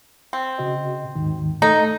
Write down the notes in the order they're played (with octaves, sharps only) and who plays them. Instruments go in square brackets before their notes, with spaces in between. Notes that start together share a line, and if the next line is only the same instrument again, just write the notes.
[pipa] C4
[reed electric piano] C#3 F#4 D#5
D#2 G#2 D#3
[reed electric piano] A3 A4 [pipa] D#4